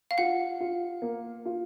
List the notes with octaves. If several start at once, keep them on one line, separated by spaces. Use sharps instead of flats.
F5
F4 F#5
F4
A#3
F4